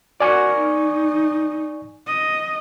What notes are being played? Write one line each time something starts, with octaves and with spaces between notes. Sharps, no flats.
F#4 A#4 D5 G#5 C#6
D#4
D#5